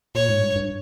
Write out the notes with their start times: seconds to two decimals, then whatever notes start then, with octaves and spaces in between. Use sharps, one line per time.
0.15 A#2 C#5
0.29 G#2
0.42 G2
0.56 G2